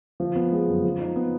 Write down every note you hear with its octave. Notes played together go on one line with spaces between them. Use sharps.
F3
B3
G#3
F#2
F3
D#4
B3